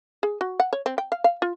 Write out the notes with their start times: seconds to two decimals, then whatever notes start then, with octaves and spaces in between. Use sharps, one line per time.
0.23 G#4
0.41 F#4
0.60 F#5
0.73 C#5
0.86 C4
0.98 G5
1.12 F5
1.24 F5
1.42 F4